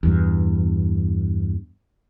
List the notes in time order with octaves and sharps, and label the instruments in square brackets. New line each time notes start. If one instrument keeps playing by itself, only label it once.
[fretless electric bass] E2 G2